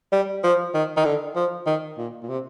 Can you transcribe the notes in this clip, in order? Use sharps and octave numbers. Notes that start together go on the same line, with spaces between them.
G3
F3
D#3
D#3
D3
F3
D#3
A#2
A#2
C3